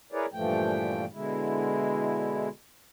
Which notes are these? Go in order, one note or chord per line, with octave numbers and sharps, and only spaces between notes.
E4 G#4 A#4 B4 C#5 D5
G2 A#2 E3 F3 A3 G5
B2 D3 G#3 E4